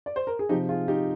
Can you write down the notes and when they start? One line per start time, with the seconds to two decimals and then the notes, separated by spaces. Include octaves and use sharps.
0.06 D5
0.16 C5
0.27 A#4
0.39 G#4
0.49 C3 F3 D#4 G4
0.69 F4 G#4
0.88 D#4 G4